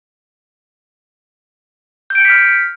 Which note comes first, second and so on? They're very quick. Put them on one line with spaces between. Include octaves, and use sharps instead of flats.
G6 D7 C#7 B6 F6